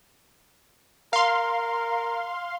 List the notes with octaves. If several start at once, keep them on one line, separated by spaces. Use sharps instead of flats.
A#4 F5 C6